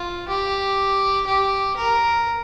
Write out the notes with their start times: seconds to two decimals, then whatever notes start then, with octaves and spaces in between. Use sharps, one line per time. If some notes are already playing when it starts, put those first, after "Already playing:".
Already playing: F4
0.28 G4
1.27 G4
1.77 A#4